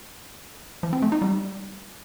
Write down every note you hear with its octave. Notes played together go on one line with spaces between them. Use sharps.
F3
C4
A3
D#4
G3